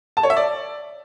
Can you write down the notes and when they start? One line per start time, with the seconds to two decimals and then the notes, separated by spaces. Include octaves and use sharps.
0.17 A5
0.23 C#5
0.30 E5
0.37 D5